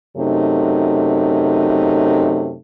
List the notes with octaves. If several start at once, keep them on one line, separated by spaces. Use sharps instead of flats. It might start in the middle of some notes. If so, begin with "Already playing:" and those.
F#2 C3 A3 D#4